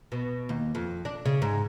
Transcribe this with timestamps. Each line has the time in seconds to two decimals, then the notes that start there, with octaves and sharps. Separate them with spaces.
0.12 B2
0.49 D#2
0.75 F2
1.05 D4
1.26 C#3
1.42 G#2